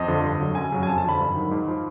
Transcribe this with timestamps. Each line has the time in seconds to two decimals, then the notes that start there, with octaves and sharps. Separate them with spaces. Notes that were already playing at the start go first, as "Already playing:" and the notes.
Already playing: F2 D#5
0.08 D3 F3
0.24 G2
0.40 D3 F#3
0.55 F#2 G#5
0.72 C#3 F#3
0.83 G#5
0.87 F2 A5
0.98 A5
1.04 D3 F3 B5
1.20 G2
1.35 D#3 F#3
1.51 G#2
1.68 F3